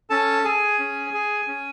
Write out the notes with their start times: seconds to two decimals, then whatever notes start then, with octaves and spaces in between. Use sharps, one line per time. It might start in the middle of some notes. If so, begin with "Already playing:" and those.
0.10 C#4 A4 A5
0.44 G#4 G#5
0.79 C#4
1.14 G#4
1.47 C#4